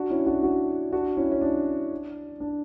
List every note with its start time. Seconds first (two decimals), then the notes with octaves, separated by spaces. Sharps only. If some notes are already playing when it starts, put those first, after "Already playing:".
Already playing: D4 F#4
0.10 C#4 E4
0.26 D4 F#4
0.43 D4 F#4
0.92 D4 F#4
1.17 C#4 E4
1.32 C#4
1.41 D4
2.40 D4